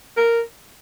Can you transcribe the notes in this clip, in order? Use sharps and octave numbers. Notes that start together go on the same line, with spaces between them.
A#4